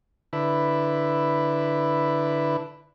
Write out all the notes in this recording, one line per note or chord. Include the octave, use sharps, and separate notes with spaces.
D3 E4 B4